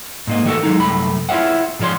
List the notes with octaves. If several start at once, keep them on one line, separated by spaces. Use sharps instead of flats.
G#2 A#3 D#5
D#3 A3 F#4 A4 A#4
F#3 G#3 D#4
C2 F#2 A3 B5
E4 F4 C#5 E5 F#5
G#2 F3 F4 C#5 C6